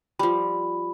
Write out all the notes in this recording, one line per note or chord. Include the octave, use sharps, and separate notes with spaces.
F3 G3 B5